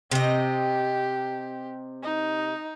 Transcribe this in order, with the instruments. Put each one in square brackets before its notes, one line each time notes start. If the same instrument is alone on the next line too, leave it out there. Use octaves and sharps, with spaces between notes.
[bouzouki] C3 D#5 [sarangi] G4
[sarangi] D#4